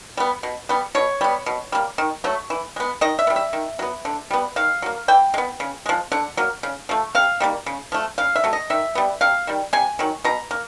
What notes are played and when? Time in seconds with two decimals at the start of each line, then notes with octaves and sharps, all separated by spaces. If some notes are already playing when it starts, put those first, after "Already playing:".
0.17 G3 B3
0.43 B2
0.69 G3 B3
0.95 B2 C#5
1.21 G3 B3
1.46 B2
1.72 G3 A#3
1.98 D#3
2.24 F#3 A3
2.50 E3
2.76 G#3 B3
3.01 D#3 D#5
3.19 E5
3.27 B3
3.30 G3
3.36 E5
3.53 D#3
3.79 F#3 B3
4.05 D3
4.31 G3 B3
4.56 D#3 F5
4.82 F#3 A#3
5.08 E3 G5
5.34 G#3
5.38 B3
5.60 C#3
5.86 F3 G#3
6.12 D3 F#5
6.37 F#3 A#3
6.63 C#3
6.89 F3 A3
7.15 C3 F5
7.40 D#3 G3 A#3
7.66 C#3
7.92 F3 A3
8.18 C#3 F5
8.36 E5
8.44 F#3 A3
8.53 D#5
8.70 D#3 E5
8.95 G3 B3
9.21 C3 F5
9.47 D#3 G3
9.73 C3 G#5
9.99 D#3 F#3
10.24 B2 A#5
10.51 A#3